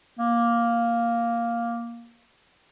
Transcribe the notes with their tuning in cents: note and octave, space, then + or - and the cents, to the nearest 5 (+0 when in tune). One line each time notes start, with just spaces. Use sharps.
A#3 +5